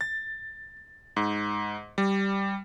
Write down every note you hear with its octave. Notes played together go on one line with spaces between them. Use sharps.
A6
G#2
G3